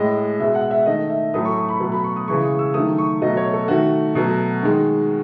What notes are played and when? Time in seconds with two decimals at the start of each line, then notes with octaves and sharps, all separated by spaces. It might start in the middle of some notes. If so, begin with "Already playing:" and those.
Already playing: A2 G#3 D#5
0.40 B2 G#3 E5
0.55 F#5
0.71 E5
0.86 D#3 A3 D#5
1.10 E5
1.34 A2 F#3 A3 D#6
1.45 C#6
1.57 C#6
1.69 B5
1.80 B2 F#3 A3
1.92 B5
2.04 C#6
2.16 D#6
2.28 C#3 E3 G#3 C#6
2.43 D#6
2.59 E6
2.74 D#3 F#3 A3 D#6
2.98 C#6
3.22 B2 F#3 A3 D#5
3.37 C#5
3.53 A4
3.68 D#3 A3 F#4
4.15 B2 F#3 A3
4.63 D#3 G#3